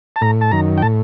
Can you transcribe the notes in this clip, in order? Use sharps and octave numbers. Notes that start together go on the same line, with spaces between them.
A5
A2 A#5
A5
F#2 D#3 A#5
G5
A2 A5